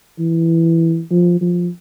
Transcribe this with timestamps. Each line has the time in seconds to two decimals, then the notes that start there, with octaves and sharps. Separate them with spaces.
0.19 E3
1.11 F3
1.41 F3